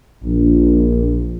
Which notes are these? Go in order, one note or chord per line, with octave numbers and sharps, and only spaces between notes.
A#1